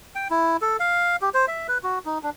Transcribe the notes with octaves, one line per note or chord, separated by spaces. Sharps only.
G5
E4
A4
F5
G4
C5
E5
B4
F#4
D#4
D4